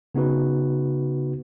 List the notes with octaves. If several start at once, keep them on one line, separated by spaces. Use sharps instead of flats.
C#3 B3 D#4 F#4 B4